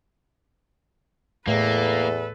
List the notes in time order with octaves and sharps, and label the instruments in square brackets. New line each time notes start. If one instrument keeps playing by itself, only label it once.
[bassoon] E2 [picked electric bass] A2 [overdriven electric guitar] A#3 [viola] A4 B4